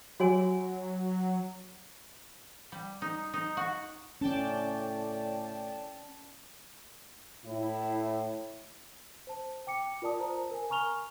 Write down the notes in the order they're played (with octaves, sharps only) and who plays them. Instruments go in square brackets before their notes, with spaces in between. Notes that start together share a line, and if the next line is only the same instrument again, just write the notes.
[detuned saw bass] F#3 [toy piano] F#4 C#5 G#5
[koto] G3
D#4
D#4
F#4
[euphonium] A2 [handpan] C#4 [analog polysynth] D5 G5 A5
[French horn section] A2 E4
[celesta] C5 A5
G5 D6 C#7
F4 A#4 D5 A5 D#6
C5 A5 A#5
A#4 G#5
G#5 A#5 C#6 F6 F7 G7